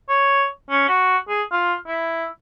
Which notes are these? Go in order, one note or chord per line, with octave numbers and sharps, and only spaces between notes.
C#5
C#4
F#4
G#4
F4
E4